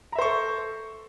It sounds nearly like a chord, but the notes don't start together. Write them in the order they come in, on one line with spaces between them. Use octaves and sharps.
A#5 E5 C5 C#6 A4